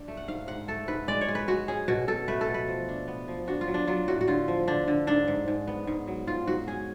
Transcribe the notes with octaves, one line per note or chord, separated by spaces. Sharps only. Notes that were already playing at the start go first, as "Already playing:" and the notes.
Already playing: D4
A3
F#5
G#2 F5
G#2 F#5
A3 A4
G#2 B4
G#3 D5
C#5
G#3
B4
G#3 F#4
C#4 G#4
B2 F#4
B2 A4
A3 B4
A4
B2
B4
F3
D4
B3
F3
D4 F#4
F4
F#3
D4
F#3 F4
A2 F#4
F#4
D3 F4
F3
D3 D4
D3
G#2 D4
G#2
G#2
B3
G#2
F#3
G#2 F4
G#2 F#4
C#4 G#4